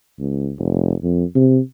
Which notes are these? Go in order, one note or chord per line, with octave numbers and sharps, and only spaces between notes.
C#2
F1
F2
C3